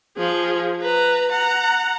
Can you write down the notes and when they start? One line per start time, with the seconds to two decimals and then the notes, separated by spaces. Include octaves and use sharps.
0.17 F3 G#4
0.82 B4 A#5
1.31 F#5 A#5